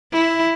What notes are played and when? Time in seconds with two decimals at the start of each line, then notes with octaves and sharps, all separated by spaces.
0.12 E4